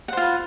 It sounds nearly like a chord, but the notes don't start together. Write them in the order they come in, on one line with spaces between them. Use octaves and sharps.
F#5 C5 F4 B4